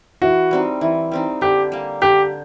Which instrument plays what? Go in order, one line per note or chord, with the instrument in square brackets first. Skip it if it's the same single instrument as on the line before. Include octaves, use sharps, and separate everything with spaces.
[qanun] E3 [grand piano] F#4
[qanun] G3 C4 D#4
E3
G3 C4 D#4
[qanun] D3 [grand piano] G4
[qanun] G3 A#3
[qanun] D3 [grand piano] G4